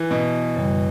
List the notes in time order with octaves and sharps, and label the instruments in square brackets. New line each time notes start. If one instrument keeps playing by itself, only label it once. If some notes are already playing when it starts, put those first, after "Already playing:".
Already playing: [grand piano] E3
B2
[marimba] F#2 C#3 G3 B3